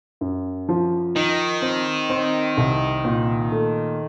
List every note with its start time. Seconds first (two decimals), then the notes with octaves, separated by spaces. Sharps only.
0.21 F#2
0.69 F3
1.15 D#3 D#4
1.62 C4
2.10 C4
2.57 C2
3.05 A#2
3.51 A3